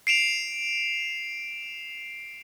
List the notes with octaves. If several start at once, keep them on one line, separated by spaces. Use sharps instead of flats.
C7 D7 E7 F7